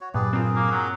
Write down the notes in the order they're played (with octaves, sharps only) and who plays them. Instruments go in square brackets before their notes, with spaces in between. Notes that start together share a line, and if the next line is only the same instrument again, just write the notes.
[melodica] F#4 C#5
[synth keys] G2 [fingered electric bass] A#2 F#3 [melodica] G#4 B4 D5
[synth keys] C4 F4 [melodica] G#4 A#4
[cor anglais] A#3
F#3